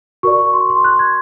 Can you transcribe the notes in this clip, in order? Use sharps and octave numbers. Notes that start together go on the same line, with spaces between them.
F#4 A#4 D5 C#6
C#6
C6
C6
F#6
G#6